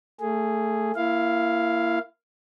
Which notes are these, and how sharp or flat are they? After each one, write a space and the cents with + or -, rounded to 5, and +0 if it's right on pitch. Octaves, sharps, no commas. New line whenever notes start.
A3 +20 G#4 +0
A#3 +0 E4 +25 F5 +0